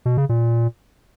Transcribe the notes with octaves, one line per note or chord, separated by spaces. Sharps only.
B2
C#3
A#2